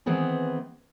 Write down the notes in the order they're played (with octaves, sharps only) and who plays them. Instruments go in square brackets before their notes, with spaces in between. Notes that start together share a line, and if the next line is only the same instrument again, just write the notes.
[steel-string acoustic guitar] D#3 E3 B3 C4 G#4 B4